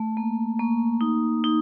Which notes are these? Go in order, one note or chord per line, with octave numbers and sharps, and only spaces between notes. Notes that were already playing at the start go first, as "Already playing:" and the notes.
Already playing: A3
A#3
A#3
D#4
D#4